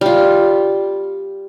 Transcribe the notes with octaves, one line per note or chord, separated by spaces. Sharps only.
G3 F4